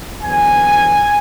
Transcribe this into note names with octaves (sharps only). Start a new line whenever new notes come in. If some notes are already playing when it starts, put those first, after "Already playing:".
E2 D3 F#3 B3 G#5